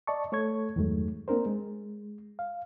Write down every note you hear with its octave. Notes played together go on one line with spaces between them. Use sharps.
D5 D#5 A5 C#6
A3 A4 C#5 C#6 G#6
E2 G2 D#3 F#3 G#3 A3
A#3 C4 D4 A#4 C5
G#3
F5